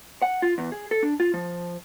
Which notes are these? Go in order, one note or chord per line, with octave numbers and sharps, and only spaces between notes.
F#5
F4
E2
G#4
A4
D4
F4
F3